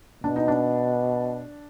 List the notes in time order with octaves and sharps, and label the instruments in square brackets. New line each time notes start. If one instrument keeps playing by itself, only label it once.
[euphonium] B2 [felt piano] D4
[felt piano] D#4
D4